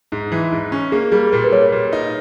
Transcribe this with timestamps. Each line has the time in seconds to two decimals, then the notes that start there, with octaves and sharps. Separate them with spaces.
0.12 G#2
0.32 E3
0.52 G#2
0.72 C#4
0.92 A#3 G#4
1.12 G3 G#4
1.32 A#2 A#4
1.44 B4
1.53 G3 C#5
1.72 A#2
1.93 D#4